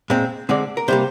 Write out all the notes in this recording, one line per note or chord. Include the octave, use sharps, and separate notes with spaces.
A#2 G#3 C4
D3 G#3 C4 D5
A#4
C3 G3 A#3 C5